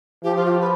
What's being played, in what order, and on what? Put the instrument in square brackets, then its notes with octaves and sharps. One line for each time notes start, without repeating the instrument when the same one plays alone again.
[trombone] F3 [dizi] G4
[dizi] F4
G4
B4